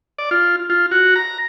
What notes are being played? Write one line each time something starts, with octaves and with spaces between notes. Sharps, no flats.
D5
F4
F4
F#4
A#5